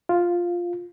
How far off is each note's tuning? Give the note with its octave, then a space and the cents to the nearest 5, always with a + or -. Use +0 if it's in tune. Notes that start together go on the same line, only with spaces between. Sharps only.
F4 +0